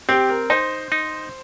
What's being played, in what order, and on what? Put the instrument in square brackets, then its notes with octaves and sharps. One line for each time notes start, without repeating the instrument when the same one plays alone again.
[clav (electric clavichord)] C4 [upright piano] G4
[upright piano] A#4
[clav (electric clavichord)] D#4 [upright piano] C5
[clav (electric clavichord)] D#4